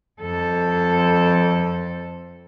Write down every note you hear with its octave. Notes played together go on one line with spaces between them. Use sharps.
F2 A4